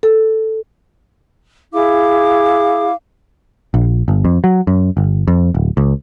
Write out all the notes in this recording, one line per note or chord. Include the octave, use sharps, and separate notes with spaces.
A4
E4 G#4 F5 D6
A#1
G1
F2
F#3
F#2
G1
F2
D1
C#2